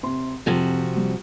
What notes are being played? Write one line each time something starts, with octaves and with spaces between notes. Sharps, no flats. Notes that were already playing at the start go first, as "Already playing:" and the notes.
C3 C6
F2 C3 F3 F#4
G3